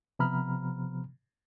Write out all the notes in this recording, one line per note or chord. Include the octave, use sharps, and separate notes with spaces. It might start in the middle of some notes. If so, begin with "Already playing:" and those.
C3 F3 B3 A#5 B5 F6